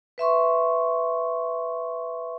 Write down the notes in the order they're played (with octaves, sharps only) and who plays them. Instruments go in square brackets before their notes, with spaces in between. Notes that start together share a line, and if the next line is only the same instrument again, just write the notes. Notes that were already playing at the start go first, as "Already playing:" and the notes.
[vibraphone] B4 E5 C6 C#6